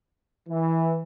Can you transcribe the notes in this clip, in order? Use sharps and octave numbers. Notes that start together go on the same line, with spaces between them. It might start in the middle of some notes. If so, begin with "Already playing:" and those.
E3